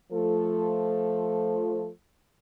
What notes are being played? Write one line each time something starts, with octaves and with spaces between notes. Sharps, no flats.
F3 A3 A4